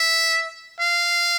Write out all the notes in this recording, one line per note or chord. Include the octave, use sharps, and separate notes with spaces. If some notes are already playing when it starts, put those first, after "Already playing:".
Already playing: E5
F5